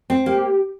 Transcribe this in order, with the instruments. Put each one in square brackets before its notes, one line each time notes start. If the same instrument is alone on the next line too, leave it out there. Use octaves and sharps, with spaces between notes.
[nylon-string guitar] C4
[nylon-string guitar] A#3 [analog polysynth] G4